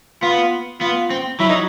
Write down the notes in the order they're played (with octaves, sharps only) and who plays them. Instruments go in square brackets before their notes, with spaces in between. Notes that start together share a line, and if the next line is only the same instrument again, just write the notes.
[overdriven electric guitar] B3 [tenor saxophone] F4
[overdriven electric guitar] B3 [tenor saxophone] F4
[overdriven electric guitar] C4
[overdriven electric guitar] F#3 [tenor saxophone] E4
[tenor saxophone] D#4